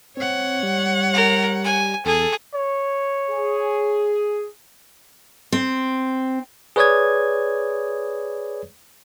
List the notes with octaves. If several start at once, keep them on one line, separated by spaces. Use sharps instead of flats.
C4 C#5 F#5
G3
A#4
G#5
E2 G#4 A4
C#5
G#4
C4
G#4 B4 C#5 D5 D#6 G#6